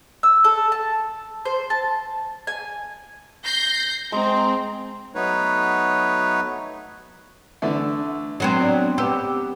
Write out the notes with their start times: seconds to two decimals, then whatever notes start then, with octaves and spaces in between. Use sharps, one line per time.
0.23 E6
0.44 A4
0.72 A5
1.45 C5
1.70 A5
2.47 G#5
3.45 G6 A#6 C7
4.12 G#3 C4 A#5
5.15 F#3 A3 B3 D#4 B4 C#5
7.62 D3 E3 A3
8.40 F#3 B3 C4
8.61 D4
8.98 B3 G4 E6